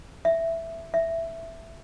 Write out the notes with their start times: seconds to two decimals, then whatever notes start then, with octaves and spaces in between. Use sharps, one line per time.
0.25 E5
0.94 E5